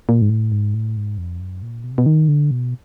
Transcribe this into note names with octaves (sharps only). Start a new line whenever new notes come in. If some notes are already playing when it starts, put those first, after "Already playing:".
A#2
G#2
A2
G#2
A2
G#2
F2
F#2
A#2
B2
C3
B2
D#3
D3
B2